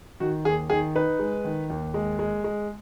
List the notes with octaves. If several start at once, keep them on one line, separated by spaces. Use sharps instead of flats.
D#3 F#4
D#2 G#4
D#3 G#4
D#4 B4
G#3
D#3
D#2
G#3
G#3
G#3